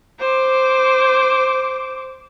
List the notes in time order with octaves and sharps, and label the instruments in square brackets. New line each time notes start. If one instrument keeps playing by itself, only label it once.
[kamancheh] C5 D6